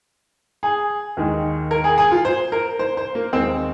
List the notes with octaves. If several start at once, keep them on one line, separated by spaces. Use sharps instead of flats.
G#4
D#2 D#3 G#3
A#4
G#4
G#4
F4
C5
A#4
C5
C5
A#3
D#2 D#3 G#3 C4